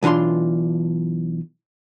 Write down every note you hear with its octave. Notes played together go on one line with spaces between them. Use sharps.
B1 E3 D4 F4 C6